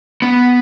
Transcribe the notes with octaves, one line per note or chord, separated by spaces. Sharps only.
B3